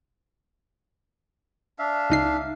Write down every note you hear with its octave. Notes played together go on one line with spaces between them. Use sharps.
D4 E5 F5
C#2 D#4 C7